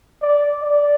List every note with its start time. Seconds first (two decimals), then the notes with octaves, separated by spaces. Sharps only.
0.22 D5
0.63 D5